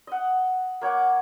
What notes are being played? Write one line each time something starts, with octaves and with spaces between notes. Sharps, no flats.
D#5 F#5
A#3 C#5 F#5 D6